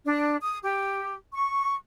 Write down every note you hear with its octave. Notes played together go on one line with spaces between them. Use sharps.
D4
D#6
G4
C#6